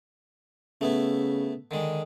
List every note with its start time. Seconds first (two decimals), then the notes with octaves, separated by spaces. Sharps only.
0.81 C#3 A3 B3 E4
1.71 D3 D#3 G#3